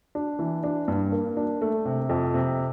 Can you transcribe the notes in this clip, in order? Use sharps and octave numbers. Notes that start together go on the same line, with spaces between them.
D4
E3
D4
G2
A#3
D4
A3
C3
F2
C3